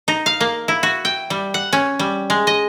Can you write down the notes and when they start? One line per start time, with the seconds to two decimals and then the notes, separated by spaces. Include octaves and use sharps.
0.08 D#4
0.26 F5
0.40 A#3
0.68 E4
0.83 F#4
1.05 G5
1.30 G3
1.54 F#5
1.73 C#4
1.99 G3
2.30 G#3
2.47 D#5